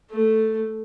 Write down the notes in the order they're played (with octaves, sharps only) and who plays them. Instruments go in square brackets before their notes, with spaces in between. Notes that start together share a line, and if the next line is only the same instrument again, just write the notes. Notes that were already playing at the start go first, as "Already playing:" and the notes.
[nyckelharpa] A3